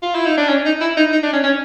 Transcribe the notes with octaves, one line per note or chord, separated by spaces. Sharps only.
F4
E4
D#4
D4
C#4
D#4
E4
D#4
D#4
D4
C#4
C#4